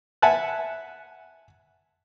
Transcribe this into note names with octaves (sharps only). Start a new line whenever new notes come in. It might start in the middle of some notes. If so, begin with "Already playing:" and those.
E5 F#5 G#5 A5 F#6